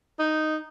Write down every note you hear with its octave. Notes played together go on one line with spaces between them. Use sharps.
D#4